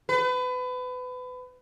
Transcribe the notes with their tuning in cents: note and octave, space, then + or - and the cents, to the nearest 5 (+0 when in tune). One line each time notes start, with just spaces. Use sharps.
B4 +30